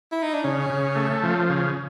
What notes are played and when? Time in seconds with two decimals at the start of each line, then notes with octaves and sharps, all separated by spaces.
0.12 E4
0.23 D#4
0.34 D4
0.44 C#3 C#4
0.70 C#3
0.96 A3
1.23 F3
1.50 C#3